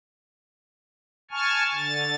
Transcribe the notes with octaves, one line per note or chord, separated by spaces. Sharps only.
G#5 A5 C#6 F6
D3 A6